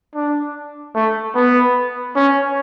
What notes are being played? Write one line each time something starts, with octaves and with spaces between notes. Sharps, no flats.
D4
A3
B3
C#4